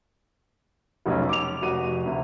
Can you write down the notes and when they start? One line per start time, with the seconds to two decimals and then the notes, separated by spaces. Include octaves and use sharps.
1.06 F1 B1 C#4
1.29 D6 F7
1.62 F1 F#4 D#7
2.06 D2 C3